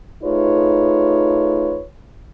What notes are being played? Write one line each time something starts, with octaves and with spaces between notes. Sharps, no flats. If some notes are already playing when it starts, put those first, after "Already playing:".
A3 D#4 F4 G#4 B4 C#5